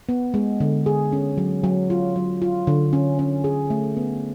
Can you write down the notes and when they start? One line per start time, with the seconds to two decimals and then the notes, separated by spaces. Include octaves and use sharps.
0.09 B3
0.34 G#3
0.60 D3
0.86 G#4
1.13 C#4
1.38 F#3
1.64 F#3
1.90 F4
2.16 F#3
2.42 F4
2.67 D3
2.93 C#4
3.19 C#4
3.44 G#4
3.70 A3
3.97 B3